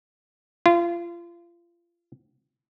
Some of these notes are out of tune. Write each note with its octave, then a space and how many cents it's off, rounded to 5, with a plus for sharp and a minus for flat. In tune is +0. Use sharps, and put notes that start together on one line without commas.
F4 -30